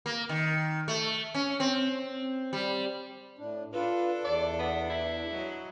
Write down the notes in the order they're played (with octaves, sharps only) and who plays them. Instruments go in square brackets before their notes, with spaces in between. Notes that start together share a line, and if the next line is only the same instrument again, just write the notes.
[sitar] A#3
D#3
A3
C#4
C4
G3
[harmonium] A2 D4
[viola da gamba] D4 A4 [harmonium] F4 B4
[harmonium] E2 [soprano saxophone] D5
[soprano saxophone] B3
E4
[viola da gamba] F#3 D#5